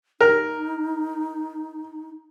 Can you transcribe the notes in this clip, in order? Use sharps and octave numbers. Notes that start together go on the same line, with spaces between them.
D#4 A#4